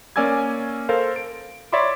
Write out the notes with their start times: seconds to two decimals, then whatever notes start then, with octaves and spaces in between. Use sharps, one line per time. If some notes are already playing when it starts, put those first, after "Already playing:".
0.16 A#3 C#4 D5 G#5 E6 G#6
0.89 A4 A#4 C5 F5
1.16 D7
1.72 C#5 D5 E5 B5 C6 D6